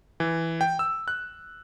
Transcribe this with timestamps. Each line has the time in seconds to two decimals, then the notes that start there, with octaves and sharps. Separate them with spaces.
0.20 E3
0.61 G5
0.79 E6
1.08 F#6